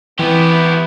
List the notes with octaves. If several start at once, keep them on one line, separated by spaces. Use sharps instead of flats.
E3 B3 E4 G4